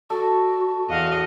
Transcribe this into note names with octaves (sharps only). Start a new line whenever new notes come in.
F#4 A4 D5
E2 F#4 D#5 F5